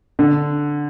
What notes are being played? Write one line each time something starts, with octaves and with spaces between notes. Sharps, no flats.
D3